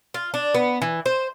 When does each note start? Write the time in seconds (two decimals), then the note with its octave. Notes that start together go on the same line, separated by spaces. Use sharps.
0.14 F4
0.34 D4
0.54 B3
0.82 E3
1.06 C5